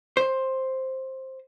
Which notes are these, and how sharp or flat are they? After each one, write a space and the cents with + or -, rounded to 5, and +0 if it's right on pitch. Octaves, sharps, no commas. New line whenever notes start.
C5 +10